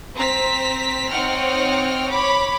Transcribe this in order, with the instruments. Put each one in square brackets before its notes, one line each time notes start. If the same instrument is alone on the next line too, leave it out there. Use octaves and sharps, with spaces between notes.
[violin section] C4 C5 A#5 B6
C4 D#4 C#5 F#5 G5 F6
C#5 B5 D6